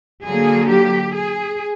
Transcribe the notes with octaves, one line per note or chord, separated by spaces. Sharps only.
D3 F#3 A#3 G#4
G4
G#4